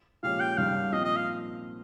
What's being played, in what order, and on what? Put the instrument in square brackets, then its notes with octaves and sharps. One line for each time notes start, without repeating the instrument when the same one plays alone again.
[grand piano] A#2 F3 G#3 C#4 G4 [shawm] F5
[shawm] G5
[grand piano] G#1 G2 D#3 G3 C#4 [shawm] F5
[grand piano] A#2 F3 C4 [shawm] D#5
[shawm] D#5
F5